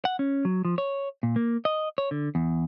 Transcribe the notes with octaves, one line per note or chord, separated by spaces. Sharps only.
F#5
C#4
F#3
F3
C#5
A#2
A#3
D#5
C#5
D3
E2